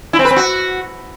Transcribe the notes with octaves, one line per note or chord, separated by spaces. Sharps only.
E4
C4
B4
C4
F#4